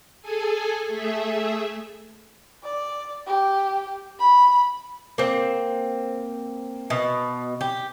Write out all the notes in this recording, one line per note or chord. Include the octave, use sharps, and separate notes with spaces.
G#4 A4 G#5
A3 G#4 E5
D5
G4
B5
A#3 C4
B2
G4